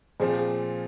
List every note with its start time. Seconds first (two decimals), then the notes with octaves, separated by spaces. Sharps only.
0.20 A#2 F3 C4 G#4 C5